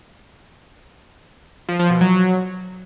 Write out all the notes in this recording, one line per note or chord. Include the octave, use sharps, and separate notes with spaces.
F3
F3
B2
F#3